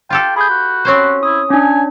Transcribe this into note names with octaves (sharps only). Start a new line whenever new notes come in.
F4 G4 A4 G5
G#4 B5 G6
F#4
C4 C#4 C5
E4 D#6
C#4 D4 G#5